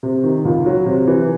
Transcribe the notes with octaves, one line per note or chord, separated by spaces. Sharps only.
C3
D#3
C#2
F#3
C3
E3